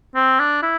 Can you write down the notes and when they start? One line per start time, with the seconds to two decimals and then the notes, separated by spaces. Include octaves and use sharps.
0.15 C4
0.40 D4
0.63 E4